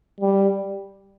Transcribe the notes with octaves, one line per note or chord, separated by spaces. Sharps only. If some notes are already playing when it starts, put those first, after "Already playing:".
G3